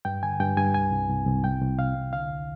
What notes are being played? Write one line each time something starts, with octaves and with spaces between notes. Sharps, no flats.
G2 G5
D3 G#5
G2 G5
G2 G#5
C2 G#5
C2
C2
C2
C2 G5
C2
C3 F5
C2
D3 F5
D#2